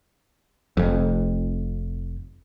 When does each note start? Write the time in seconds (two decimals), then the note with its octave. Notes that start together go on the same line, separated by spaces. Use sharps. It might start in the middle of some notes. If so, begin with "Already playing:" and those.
0.77 F1 F2